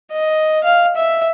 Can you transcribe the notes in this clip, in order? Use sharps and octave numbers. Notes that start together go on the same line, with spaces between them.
D#5
F5
E5